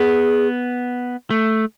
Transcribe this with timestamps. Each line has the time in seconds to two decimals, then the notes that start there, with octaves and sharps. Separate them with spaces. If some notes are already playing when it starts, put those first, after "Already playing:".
Already playing: B3 G#4
1.30 A3